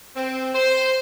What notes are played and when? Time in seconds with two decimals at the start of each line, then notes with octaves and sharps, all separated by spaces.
0.16 C4
0.54 C5